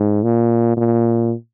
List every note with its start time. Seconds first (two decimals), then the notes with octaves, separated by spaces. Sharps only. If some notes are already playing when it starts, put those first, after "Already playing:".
Already playing: G#2
0.24 A#2
0.77 A#2